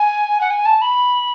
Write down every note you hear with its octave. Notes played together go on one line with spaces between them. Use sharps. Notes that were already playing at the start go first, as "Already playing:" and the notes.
Already playing: G#5
F#5
G#5
A5
B5